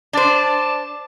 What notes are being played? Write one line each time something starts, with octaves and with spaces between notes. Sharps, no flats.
D4 C5 D5 A5